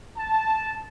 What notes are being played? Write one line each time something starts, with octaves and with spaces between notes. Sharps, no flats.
A5